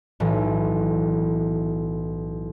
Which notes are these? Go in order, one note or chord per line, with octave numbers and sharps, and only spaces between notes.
B1 A2 E3